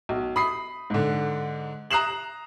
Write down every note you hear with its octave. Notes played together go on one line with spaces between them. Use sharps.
B1
B5 D#6 C7
G#2 D3
A#5 D#6 F#6 C7 E7 F#7